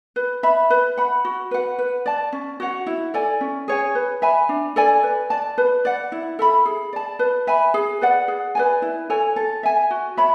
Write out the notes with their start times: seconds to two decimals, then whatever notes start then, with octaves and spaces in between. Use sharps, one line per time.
0.16 B4
0.43 E5 B5
0.70 B4
0.97 F#5 B5
1.25 F#4
1.51 B4 F#5
1.78 B4
2.06 D5 A5
2.32 C#4
2.60 F#4 C#5 F#5
2.86 E4
3.14 A4 D5 G#5
3.41 C#4
3.68 G#4 C#5 G#5
3.95 B4
4.22 E5 G#5 B5
4.49 D4
4.76 A4 D5 G#5
5.03 B4
5.30 D5 A5
5.58 B4
5.85 D5 F#5
6.12 E4
6.39 A4 E5 B5
6.65 G#4
6.93 D5 A5
7.19 B4
7.47 E5 G#5 B5
7.74 G#4
8.01 B4 D5 F#5
8.28 G#4
8.55 B4 D5 G#5
8.82 E4
9.10 A4 C#5 G#5
9.36 A4
9.63 E5 G#5
9.91 F#4
10.17 C#5 E5 B5